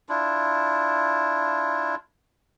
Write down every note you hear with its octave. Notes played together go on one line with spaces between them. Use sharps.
D4 E4 F4